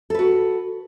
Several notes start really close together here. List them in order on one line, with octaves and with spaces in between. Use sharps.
A4 B4 F#4